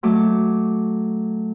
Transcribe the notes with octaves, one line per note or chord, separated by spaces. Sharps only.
F#3 A3 D6